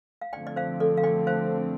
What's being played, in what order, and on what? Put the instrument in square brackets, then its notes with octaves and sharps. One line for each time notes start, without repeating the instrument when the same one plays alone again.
[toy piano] F5
[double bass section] D3 F3 A3 C4 [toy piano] D5 G5
[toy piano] D5
C5 F5
A4 D5
F5
D5 G5
C5 F5